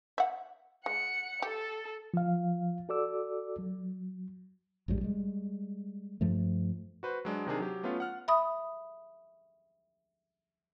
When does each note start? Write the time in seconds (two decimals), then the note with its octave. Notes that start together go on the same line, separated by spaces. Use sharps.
0.18 E5 F#5
0.86 G#3 F#5 C#7
1.42 G4 A4
2.14 F3 F5
2.89 F#4 A4 D5 D6 E6
3.59 F#3
4.88 A#1 G#2 E3 G3
5.01 G3 G#3
6.21 G2 F3 A3
7.03 F#4 B4 C5
7.25 F#3 G#3 D4
7.46 C3 D#3 D4 G#4
7.59 F#3 G4
7.83 A3 B3 C#4 F4
8.00 F#5 F6
8.28 E5 B5 D#6